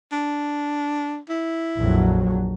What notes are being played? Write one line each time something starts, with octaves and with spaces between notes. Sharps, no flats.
D4
E4
A#1 F2 F#3